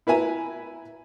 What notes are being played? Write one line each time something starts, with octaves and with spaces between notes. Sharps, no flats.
E4 B4 E5 G#5 A#5